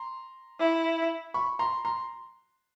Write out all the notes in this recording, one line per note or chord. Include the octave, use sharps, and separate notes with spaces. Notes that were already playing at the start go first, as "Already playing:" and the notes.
Already playing: A#5 C6
E4
B5 C#6
A#5 C6
A#5 C6